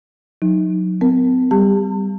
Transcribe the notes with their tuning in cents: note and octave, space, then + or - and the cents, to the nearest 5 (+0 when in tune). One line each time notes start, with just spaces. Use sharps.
F#3 -20 D#4 +0
C4 -45 A#4 +0
G3 +0 G4 +30 A5 +40